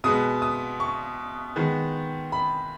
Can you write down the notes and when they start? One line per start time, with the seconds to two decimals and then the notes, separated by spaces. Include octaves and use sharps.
0.04 B2 G#3 B3 D#6
0.42 D#6
0.80 C#6
1.56 D#3 G#3 B3
2.32 B5